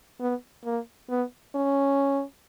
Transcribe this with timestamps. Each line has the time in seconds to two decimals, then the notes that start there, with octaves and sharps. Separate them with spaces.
0.20 B3
0.65 A#3
1.10 B3
1.55 C#4